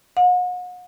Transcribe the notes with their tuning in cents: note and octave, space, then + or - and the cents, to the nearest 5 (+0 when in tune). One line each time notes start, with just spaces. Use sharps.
F#5 -40